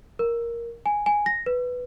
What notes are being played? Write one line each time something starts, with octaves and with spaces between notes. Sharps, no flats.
A#4
G#5
G#5
A#6
B4